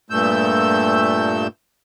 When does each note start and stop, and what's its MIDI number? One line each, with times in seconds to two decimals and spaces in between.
0.10 1.47 43
0.10 1.47 46
0.10 1.47 57
0.10 1.47 88
0.10 1.47 91